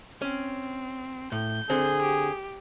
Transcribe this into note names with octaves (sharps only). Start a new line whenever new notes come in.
C4 C#4
A2 G6
D3 C4 G#4
G4